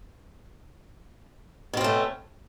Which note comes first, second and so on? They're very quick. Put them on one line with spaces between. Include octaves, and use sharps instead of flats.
B2 C4 C#4 A3